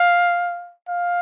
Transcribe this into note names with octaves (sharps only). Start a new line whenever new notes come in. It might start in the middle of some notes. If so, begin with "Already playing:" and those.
Already playing: F5
F5